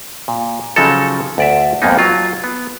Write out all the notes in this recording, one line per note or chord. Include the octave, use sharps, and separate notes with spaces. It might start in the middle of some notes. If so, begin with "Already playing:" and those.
A#2
C#3 F3 F#3 D#4 A4
D2 D5 E5
F2 G#2 A#3 B3 D#4
F#3 F4
B3